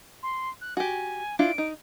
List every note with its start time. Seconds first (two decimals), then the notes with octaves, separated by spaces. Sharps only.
0.23 C6
0.61 F#6
0.77 F#4 G4 G#5
1.39 D4 E4 F4 D7
1.58 D#4